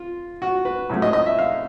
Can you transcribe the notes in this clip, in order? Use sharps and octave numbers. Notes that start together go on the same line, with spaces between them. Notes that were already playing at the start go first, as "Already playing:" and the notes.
Already playing: F4
F#4
B4
A2 F#3 A3 C#4
D#5
D#5
E5
F5